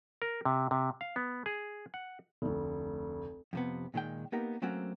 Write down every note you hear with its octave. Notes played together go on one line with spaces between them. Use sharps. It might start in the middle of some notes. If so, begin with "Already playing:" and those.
A#4
C3
C3
F5
B3
G#4
F#5
F1 D2
F2 C3 B3
A#2 D#3 G#3 G5
A#3 B3 D#4 G4 A#4
F#3 A3 A#3 C4 C#4 F#4